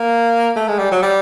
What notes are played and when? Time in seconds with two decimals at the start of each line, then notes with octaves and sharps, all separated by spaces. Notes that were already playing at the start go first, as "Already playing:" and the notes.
Already playing: A#3
0.56 A3
0.68 G#3
0.79 G3
0.91 F#3
1.02 G3